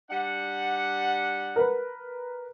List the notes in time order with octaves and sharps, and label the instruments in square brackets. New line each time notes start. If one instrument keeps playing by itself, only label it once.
[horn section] G3 D4 F#5
[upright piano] A#4 B4